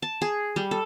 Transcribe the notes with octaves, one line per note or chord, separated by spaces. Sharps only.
A5
G#4
G3
A4